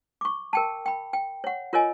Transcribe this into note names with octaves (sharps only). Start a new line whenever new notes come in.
C#6 D6
A#4 G5 A5
G5 B5
G5
C#5 F#5
F4 A#4 C#5 D#5 G#5